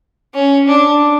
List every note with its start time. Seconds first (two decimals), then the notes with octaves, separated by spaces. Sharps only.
0.34 C#4
0.68 D4